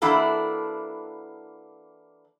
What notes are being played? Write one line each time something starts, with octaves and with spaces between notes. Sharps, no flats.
E3 A#3 D4 E4 F#4 A4